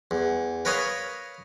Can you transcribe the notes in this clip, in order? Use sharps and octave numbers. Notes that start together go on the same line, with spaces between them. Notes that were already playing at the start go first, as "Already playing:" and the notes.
E2
A#4 B4 C#5 D#5 F5